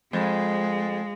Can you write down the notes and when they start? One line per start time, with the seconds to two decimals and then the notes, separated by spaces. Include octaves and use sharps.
0.13 F2 G#3